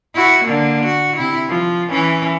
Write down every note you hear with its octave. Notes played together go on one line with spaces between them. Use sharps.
E4 F#4
D3 A#3
F#4
C3 E4
F3
E3 C#4